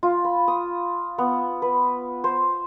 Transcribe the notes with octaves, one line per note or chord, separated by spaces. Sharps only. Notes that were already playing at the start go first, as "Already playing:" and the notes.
F4
B5
D#6
B3
B4
C5